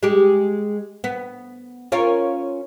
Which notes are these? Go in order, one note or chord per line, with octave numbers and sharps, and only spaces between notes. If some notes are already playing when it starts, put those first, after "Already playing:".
G#3 G4
B3
C#4 F4 A#4